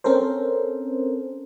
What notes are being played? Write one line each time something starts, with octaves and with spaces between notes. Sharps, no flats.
C4 C#4 A4 A#4 C5